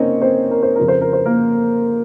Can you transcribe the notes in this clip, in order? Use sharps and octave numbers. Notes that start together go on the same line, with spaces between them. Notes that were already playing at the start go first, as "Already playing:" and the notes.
Already playing: C#3 A#3 C4 C#4 D#4 C#5 D#5
C4 C5
A#4
C5
F2 C#3 F3 A#4
C5
A#4
C5
A#3 A#4